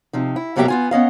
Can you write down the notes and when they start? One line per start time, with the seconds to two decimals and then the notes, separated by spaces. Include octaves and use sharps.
0.13 C3 F3 D#4
0.36 E4
0.56 F2 B2 F#3 A#3 G4 E5
0.68 B3 F4 G#5
0.91 B3 C#4 D#5 F5